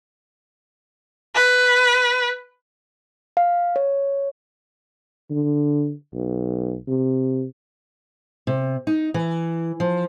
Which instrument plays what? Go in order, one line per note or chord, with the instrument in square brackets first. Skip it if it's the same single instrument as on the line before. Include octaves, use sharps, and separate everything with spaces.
[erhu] B4
[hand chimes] F5
C#5
[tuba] D3
B1
C3
[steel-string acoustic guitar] C3
D#4
E3
F3